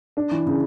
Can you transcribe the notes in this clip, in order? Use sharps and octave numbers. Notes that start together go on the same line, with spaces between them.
D4
E3
C#3